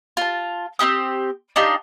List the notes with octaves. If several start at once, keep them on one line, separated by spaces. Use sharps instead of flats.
F4 A5
C4 E4 G4 D#6
D4 D#4 F4 G4